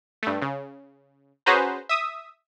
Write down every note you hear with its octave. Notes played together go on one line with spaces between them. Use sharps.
G2 A3
C#3
C#4 F#4 G#4 B4 C5 A#5
E5 D#6